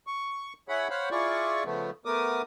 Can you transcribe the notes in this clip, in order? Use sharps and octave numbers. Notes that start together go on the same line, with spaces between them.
C#6
E4 G#4 C#5 F#5 B5
C5 C#5 F5 F#5 B5
E4 F4 G#4 D5 C#6
C#3 F3 A3 B3
A3 B3 A#4 D6 D#6